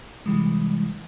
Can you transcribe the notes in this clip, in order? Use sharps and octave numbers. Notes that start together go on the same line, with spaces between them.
C3 E3 G3 G#3